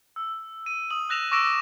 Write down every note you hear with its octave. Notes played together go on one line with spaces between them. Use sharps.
E6
D#7
D#6 F#7
E6 F#6 A#6 E7 F7
C#6 D6 E6 A#6 D7 E7